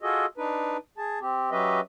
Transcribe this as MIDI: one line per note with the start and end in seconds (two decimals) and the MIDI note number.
0.03 0.26 65
0.03 0.26 66
0.03 0.26 68
0.03 0.26 69
0.03 0.26 75
0.38 0.77 62
0.38 0.77 63
0.38 0.77 71
0.98 1.19 68
0.98 1.19 81
1.21 1.51 60
1.21 1.51 67
1.51 1.80 54
1.51 1.80 61
1.51 1.80 67
1.51 1.80 71
1.51 1.80 75
1.51 1.80 76